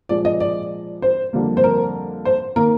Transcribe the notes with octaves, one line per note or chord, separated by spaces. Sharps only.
A#2 F3 G#3 D5
D#5
D5
C5
F2 D3 G3 A#3
C5
A#4
C5
D#3 A#3 A#4